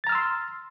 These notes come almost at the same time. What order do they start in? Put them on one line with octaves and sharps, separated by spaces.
A6 A#5 F6 E6 C6